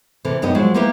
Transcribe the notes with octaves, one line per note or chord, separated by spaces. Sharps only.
C3 E3 A4
F#2 B3 D#4 G4 D#5
F3 F#3 G#3
A#3 B3 D#4 E4 G4 B4